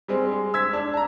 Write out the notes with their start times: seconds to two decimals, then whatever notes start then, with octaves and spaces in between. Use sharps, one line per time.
0.08 G3 G#3 C4
0.31 G#3
0.54 E6 G#6 B6
0.73 D4
0.94 A5 A#5